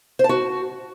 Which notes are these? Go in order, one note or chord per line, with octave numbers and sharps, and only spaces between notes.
C5
A5
F#4